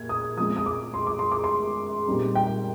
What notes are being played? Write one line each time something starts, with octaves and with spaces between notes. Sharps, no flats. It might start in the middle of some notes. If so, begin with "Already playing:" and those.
Already playing: A#2 G#6
D#6
F3 G#3 C4 D#6
D#6
D6
C6
D6
C6
D6
C6
A#2 G3 C4 D#4
G5